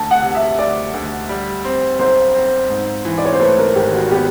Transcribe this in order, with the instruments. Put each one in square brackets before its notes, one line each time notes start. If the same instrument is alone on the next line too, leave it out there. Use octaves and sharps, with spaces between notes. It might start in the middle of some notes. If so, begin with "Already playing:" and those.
Already playing: [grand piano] D2 [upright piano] A5
[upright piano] F#5
[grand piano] C3
[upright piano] E5
[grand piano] D2 [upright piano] D5
[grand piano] D2
G3
C4
[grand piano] B1 [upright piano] C5
[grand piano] C4
G#2
E3
[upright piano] D5
C#5
C5
[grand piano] A3 [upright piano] B4
[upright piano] A#4
[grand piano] G#1 [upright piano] G4
[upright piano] F#4
[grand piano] B3 [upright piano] G4